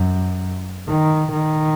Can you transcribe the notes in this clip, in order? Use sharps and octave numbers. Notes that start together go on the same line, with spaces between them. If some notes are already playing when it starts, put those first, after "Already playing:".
Already playing: F#2
D#3
D#3